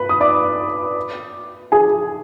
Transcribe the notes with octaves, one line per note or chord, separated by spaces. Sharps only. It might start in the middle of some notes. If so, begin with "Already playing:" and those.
Already playing: B4 B5
D#6
D5 D6
G#4 G#5